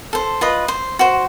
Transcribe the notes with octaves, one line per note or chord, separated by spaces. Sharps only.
A4 C5
F4 B4 D#5
C5
F#4 C5